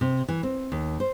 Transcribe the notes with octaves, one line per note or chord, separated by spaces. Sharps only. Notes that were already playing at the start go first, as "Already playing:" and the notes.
C3
E3
C4
D#2
C5